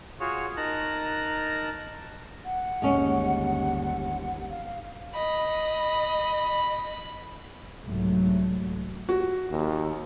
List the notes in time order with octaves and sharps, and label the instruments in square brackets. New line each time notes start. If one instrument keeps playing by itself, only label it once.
[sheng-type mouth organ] F4 F#4 G#4 C#5
D#4 A#4 A5 A#5 F#6
[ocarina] F#5
[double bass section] G1 D#2 [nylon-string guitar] G#3 C#4
[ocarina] F5
[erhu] D#5 [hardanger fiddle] B5
[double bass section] C2 G#2 F#3 A3
[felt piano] F#4
[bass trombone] D#2